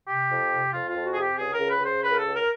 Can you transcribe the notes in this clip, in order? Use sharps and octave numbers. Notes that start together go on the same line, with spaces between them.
C3 G4
F2
C3
F2 F4
F4
F2
F#4
G#4
C3 G4
C#2 G#4
A#4
C#3
B4
C#3
C5
C#2 B4
A#4
A4
C#2
A#4